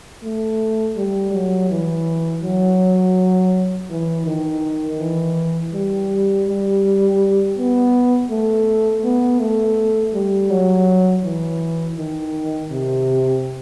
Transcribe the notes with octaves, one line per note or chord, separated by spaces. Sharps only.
A3
G3
F#3
E3
F#3
E3
D#3
E3
G3
G3
B3
A3
B3
A3
G3
F#3
E3
D#3
C3